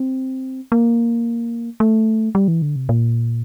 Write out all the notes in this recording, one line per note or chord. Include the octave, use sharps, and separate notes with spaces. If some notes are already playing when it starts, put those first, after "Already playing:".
Already playing: C4
A#3
A3
G3
E3
D3
C3
A#2